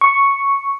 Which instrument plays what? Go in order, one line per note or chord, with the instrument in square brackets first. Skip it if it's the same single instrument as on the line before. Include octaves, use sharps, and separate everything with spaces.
[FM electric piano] C#6